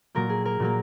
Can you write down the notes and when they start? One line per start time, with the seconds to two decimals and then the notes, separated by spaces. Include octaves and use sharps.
0.15 A#2 F#3 A#3 A#4
0.29 G#4
0.45 A#4
0.60 A#2 F#3 A#3